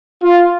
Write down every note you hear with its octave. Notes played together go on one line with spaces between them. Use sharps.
F4